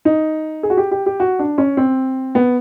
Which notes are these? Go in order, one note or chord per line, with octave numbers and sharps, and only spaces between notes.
D#4
G#4
F#4
G4
G4
G4
F#4
D4
C#4
C4
B3